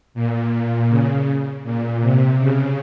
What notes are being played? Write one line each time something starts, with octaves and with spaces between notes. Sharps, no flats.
A#2
C#3
A#2
C3
C#3